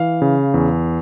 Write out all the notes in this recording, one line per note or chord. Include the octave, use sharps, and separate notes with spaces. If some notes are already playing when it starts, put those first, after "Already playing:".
Already playing: E3 F5
C#3
E2